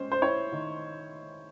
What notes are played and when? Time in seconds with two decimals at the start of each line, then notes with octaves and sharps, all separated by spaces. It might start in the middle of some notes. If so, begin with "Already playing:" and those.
Already playing: G#3 C#4 C5
0.12 C5
0.22 E4 C#5
0.52 D#3